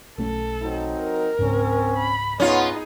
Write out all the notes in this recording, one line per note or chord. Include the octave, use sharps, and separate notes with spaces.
B1 A3 C#4 A4
F#3 C4 D#4
A#4
C#2 G#2 C4 C#4
B5
B3 C#4 D#4 F4 G#4